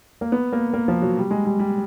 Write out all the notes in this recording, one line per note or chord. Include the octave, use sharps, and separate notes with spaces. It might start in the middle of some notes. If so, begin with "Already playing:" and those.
A#3
B3
A#3
A#3
F3
F#3
G3
G#3
G3
G3